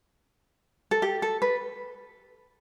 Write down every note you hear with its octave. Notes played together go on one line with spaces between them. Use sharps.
A4
G4
A4
B4